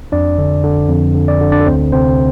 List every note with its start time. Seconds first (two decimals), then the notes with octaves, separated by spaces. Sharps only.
0.12 F2 D4 D5
0.38 D3
0.64 D3
0.89 F2
1.15 D3
1.28 D5
1.41 D3
1.52 D4 D5
1.61 A4
1.66 D2 C4 C5
1.92 C3 C4 C5